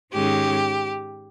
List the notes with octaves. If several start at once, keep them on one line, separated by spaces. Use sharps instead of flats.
G#2 D#3 G#3 C#4 G4